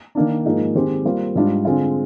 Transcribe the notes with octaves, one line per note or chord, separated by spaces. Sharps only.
D#3 A#3 D4
G#2 F3 A#3 D#4 G#4
D#3 G#3 C4 G4 C5
G3 A#3 F4 C5
G#2 G3 D4 F4
D3 G#3 C4 F4